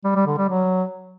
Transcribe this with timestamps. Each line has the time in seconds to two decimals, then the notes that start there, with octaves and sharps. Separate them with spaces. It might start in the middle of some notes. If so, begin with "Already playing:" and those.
0.05 G3
0.16 G3
0.27 D3
0.38 G3
0.49 F#3